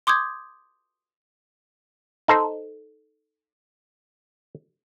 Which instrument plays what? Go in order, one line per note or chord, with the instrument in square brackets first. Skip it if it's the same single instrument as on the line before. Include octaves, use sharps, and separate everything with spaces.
[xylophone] C6 D6 D#6 G6 G#6
[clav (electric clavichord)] D#4 A4 C5